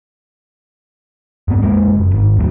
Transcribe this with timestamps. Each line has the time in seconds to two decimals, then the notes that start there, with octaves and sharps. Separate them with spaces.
1.48 F2 G#2 B3
1.63 F2 G#3 A#3
1.96 F#1
2.13 G#1
2.37 D#2 A2 F#3